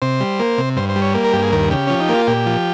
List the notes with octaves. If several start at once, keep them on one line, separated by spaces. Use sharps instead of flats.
C3 C5
G3
A#3
C3
G2 C5
C5
G3
C#5
A#3
A#4
G2 G4
G#4
D#2 A#4
C#3 G4
F3 C#4
D#4
A#3 F4
A#2 G4
F3